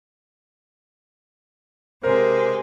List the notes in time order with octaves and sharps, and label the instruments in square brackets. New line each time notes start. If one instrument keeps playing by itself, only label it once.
[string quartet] C3 G#3 [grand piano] A#4 [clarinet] C5